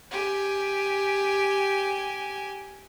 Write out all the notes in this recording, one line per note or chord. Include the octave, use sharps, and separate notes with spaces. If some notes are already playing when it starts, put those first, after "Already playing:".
G4 G#5